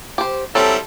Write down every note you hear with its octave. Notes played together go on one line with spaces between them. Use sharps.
G4 C5
F#3 G3 C4 E4 A4